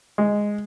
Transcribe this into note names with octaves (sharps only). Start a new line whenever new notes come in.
G#3